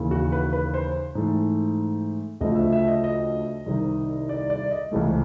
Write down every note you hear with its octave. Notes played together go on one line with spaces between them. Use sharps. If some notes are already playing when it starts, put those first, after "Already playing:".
Already playing: D#2 C#3 E3
F#4
B4
B4
C5
G#2 E3 A3
D2 C#3 F3 A3 D#5
E5
E5
D#5
D#5
C2 C3 D#3
D5
D5
D#5
C#2 C3 E3 A3